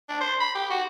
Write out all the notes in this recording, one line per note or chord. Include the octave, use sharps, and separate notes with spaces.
D4
C5
B5
G4
F#4